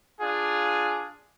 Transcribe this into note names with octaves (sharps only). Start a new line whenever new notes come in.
D4 F4 G#4